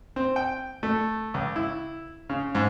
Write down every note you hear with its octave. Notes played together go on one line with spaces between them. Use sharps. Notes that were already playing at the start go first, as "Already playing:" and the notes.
C4
G5
A3
C#2
E4
C#3
G#2